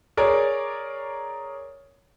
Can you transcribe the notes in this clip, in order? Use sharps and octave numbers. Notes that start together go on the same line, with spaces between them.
G#4 A#4 C#5 D5